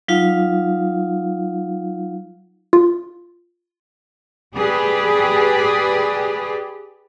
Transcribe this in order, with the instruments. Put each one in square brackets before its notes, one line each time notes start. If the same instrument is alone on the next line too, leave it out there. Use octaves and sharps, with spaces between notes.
[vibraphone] F#3 D#4 F4 F5
[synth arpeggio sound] F4
[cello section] G4 G#4 B4 D5